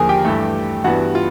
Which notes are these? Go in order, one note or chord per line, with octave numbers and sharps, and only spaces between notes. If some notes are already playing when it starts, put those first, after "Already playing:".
Already playing: D#2 D3 F3 G#4 A#4 G#5
G4 G5
G2 E3 A3
G2 E3 G3 B3 F#4 F#5
F4